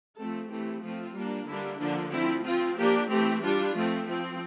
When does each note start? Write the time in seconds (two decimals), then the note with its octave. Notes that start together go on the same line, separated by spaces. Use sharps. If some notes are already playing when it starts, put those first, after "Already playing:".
0.17 F3 A3 C4 A4
0.49 E3 A3 C4 G4
0.82 F3 A3 C4 F4
1.14 G3 A#3 D4
1.47 D3 G3 A#3 D4 E4
1.79 D3 F3 A#3 D4
2.12 F3 A3 C4 E4
2.45 F3 C4 F4
2.77 F3 A#3 D4 G4
3.10 E3 A3 C4 G4
3.42 G3 D4 F4
3.75 F3 A3 C4
4.08 F3 C4